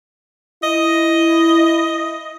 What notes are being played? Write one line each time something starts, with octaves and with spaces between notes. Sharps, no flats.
E4 D#5